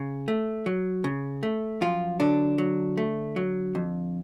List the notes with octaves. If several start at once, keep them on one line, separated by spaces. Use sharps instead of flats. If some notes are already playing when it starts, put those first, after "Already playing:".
Already playing: C#3
A3
F#3
C#3
A3
F#2 F3 F4
D3 F#3 D4
F#3
A3
F#3
F2